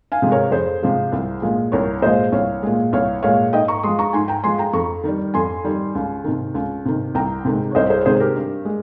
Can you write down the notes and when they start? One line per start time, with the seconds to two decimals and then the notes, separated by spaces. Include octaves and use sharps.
0.12 F5 G#5
0.22 C3 F3 G#3
0.31 A#4 C#5
0.51 F2 G#4 C5
0.82 C3 F3 G#3
1.12 C2
1.42 A#2 F3 G#3
1.72 C2 A#4 C#5
2.02 A#2 F3 G#3 C5 D#5
2.32 C2 C#5 F5
2.63 A#2 G#3
2.93 C2 C#5 F5
3.23 A#2 G#3 C#5 F5
3.53 G#2 D#5 G5
3.68 A#5 C#6
3.83 F3 G#3 C6 D#6
3.99 A#5 C#6
4.13 G#2 G#5 C6
4.28 G5 A#5
4.43 F3 G#3 G#5 C6
4.58 G5 A#5
4.73 F2 A#5 C#6
5.04 D#3 G3
5.34 F2 G#5 C6
5.64 D#3 G3
5.95 C#2
6.24 C3 D#3
6.54 C#2
6.85 C3 D#3
7.15 C2 G5 A#5
7.45 C3 D#3 G#3
7.71 C#5
7.75 C2 C5 D#5
7.90 G#4 C5
8.05 C3 D#3 G#3 G#4 C5
8.20 G4 A#4
8.36 G2
8.65 G#3